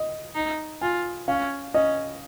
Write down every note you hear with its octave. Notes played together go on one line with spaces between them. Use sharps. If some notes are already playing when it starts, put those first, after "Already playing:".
Already playing: D#5
D#4
F4 G#5
C#4 F5
C#4 D#5